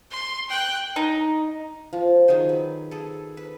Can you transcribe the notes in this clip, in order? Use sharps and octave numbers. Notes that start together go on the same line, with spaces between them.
C6
G5 F#6
D#4
F3
D#3 F#3 G#4 C5
B4
G#4 A4
B4